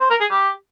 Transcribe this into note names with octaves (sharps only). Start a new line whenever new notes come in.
C5
A#4
G#4
G4